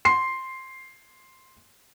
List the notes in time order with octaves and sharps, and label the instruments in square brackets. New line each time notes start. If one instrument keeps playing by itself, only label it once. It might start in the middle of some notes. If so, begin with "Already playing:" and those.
[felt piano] C6 C7